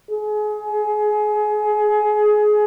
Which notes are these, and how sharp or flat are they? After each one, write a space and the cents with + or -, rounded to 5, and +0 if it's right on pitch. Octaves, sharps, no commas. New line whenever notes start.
G#4 +25